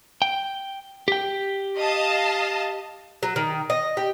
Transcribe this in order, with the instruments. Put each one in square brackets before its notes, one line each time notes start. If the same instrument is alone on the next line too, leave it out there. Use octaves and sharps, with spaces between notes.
[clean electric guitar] G5
G4 G5
[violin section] D#5 F5 A5
[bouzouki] F#3
D#3
D#5
G4